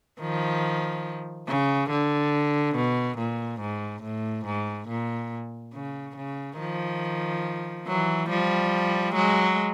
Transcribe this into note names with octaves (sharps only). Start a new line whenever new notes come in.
D#3 F3
C#3
D3
B2
A#2
G#2
A2
G#2
A#2
C#3
C#3
D#3 F3
E3 F#3
F3 G3
F#3 G#3